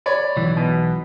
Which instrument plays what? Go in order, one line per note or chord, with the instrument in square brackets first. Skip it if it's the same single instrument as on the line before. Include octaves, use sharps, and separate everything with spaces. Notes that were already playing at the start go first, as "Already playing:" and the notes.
[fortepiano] C#5 D5 B5
[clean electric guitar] B1 E3
[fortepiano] B2